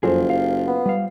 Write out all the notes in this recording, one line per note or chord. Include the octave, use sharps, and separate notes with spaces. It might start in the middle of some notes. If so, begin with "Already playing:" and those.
F#1 F2 F#3 F4 G#4 A4 C5
F5
B3
G3 F5